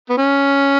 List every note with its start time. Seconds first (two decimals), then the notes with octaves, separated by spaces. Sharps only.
0.09 B3
0.18 C#4